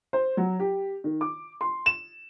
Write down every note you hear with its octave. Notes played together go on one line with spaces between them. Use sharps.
C5
F#3
G4
D#3
D6
C6
E7